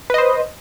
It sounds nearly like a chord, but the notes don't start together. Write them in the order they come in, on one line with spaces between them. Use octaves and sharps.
B4 D#5 C5